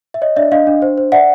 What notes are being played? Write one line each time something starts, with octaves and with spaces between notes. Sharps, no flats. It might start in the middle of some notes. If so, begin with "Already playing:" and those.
E5
C#5 D#5
D4 D5 E5
D4 D#5 F5
D4
C5
C5
D5 E5 F#5